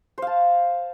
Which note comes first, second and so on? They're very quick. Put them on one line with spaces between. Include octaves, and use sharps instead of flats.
C5 F5 A5